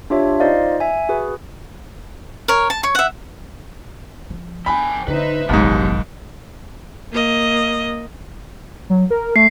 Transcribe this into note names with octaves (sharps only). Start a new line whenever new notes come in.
D4 F4 G4 C#5 E5
D#4 F4 C5 D5 D#5 F5
E5 G#5
F#4 G#4 B4
A#4 C#5
A5
C#5 C#6
E5 F#5
F3
F3 B3 D4 G5 G#5 B5
D3 A#3 D#4 B4 C5 E5
F1 A#1 D#2 G#2 F#3 B3 G4
A#3 D#5
F#3
A#4
A3 C7